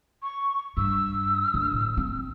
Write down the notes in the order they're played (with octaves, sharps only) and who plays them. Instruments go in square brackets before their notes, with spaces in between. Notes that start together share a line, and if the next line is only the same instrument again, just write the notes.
[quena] C#6
[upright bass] G2 [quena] E6
[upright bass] D3
A2
C4